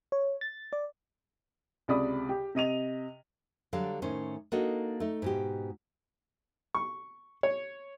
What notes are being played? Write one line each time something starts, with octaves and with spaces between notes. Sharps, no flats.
C#5
A6
D5
C#2 C3 D5 B5 D#6
G4
C3 D#5 D#7 F7
D3 F#3 G3 F5 A5
A2 D#3 C#4 C5
A#3 D4 D#4 F#4 A4 D#5
A3 D#4
G#2 B2 G4
C#6
C#5